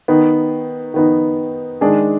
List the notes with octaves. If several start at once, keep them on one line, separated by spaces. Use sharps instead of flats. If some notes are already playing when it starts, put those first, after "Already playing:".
D#3 B3 D#4
D#3 B3 D#4
D#3 G#3 D4 G#4